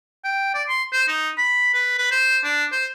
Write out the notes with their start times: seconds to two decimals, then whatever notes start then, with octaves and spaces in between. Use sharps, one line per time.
0.24 G5
0.54 D5
0.69 C6
0.93 C5
1.08 D#4
1.38 B5
1.74 B4
1.98 B4
2.11 C5
2.44 D4
2.72 C5